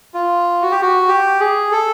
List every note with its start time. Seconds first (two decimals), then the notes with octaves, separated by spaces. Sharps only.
0.14 F4
0.62 F#4
0.71 G4
0.82 F#4
1.08 G4
1.40 G#4
1.72 A4